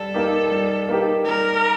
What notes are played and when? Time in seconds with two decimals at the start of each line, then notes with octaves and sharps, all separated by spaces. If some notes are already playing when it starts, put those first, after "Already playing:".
Already playing: G3 A4
0.14 A#3 D#4 G4
0.51 G3
0.89 A#3 D#4 G4
1.25 G3 A#4